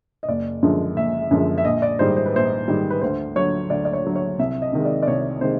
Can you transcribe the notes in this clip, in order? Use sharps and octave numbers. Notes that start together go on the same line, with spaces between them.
D#5
F#1 D5
F#2 D3 F3 G#3
F#1 E5
F#2 D3 F3 G#3
E5
A#1 D#5
D5
G#2 D#3 G3 C5
C5
B4
A#1 C5
G#2 D#3 G3
B4
D2 C5
D3 F#3 C#5
D2 D5
D5
C#5
D3 F#3
C#5
C2 E5
D#5
C3 D#3 G#3
D5
D5
C2 C#5
C3 D#3 G#3 C5